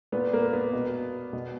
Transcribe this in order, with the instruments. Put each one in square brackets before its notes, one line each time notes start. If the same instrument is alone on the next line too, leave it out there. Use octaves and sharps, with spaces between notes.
[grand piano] A#2 B3
A#3
B3
B2
B2